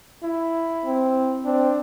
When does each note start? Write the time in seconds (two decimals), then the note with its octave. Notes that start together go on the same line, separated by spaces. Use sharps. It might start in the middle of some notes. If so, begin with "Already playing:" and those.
0.23 E4
0.85 C4
1.45 C4 D4